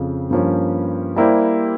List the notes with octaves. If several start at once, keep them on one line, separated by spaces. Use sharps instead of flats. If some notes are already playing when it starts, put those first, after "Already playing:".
Already playing: F2 C#3 F3
G2 F3 A#3 C#4
G3 A#3 E4 G4 C5